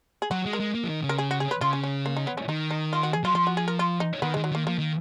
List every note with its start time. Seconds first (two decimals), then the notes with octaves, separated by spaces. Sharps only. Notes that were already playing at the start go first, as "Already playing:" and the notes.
0.22 G#4
0.31 F#3 F#4
0.46 G#3
0.53 A#4
0.60 G#3
0.75 A#3
0.83 F3
0.89 D#3
1.04 C#3
1.09 A#4
1.18 G#4
1.31 F#4
1.40 G#4
1.51 B4
1.61 C#3 F4
1.73 C#4
1.84 C#4
2.06 A#3
2.16 D#4
2.27 B3
2.38 C#4
2.49 D#3 D#4
2.71 D#4
2.93 F4
3.03 F#4
3.13 G#4
3.24 F#3 F4
3.35 F3 F4
3.47 F#4
3.57 G#4
3.68 A#4
3.79 F4
4.00 D#4
4.22 D#3 B3
4.34 D#3 G#3
4.44 F#3
4.52 D#3 A#3
4.67 F3 A#3
4.79 D#3